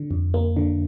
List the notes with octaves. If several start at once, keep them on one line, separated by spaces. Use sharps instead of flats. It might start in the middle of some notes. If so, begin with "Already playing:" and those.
Already playing: D3
F2
A#3
D3